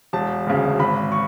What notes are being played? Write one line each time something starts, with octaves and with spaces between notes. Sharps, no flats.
E1 A5
D2 C#3
G#1 B5
C#6